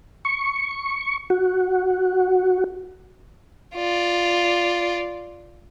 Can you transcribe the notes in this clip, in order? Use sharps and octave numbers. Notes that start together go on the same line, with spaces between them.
C#6
F#4
F4 D5